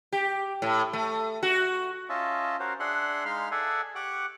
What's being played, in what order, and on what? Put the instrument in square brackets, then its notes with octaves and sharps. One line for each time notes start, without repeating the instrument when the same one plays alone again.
[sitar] G4
A2
A3
F#4
[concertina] C#4 F4 D#5 E5 A5
C#4 F#4 A#4 C5 F5
D4 G#4 E5 F#5 C6 F#6
G#3 D#4 F5 B5 C6 F6
G#4 A4 D5 E5 F#5 G#5
G4 F#5 C#6 D6 F#6